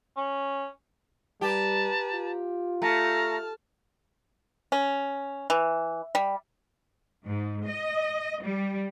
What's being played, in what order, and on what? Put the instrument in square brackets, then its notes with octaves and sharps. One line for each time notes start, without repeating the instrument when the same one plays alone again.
[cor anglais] C#4
[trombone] G3 [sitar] G4 [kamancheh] B4 A#5 [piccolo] A5
[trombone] F4
[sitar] A3 [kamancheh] A5 F6 [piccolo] A#5
[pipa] C#4
E3
G3
[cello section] G#2
D#5
G3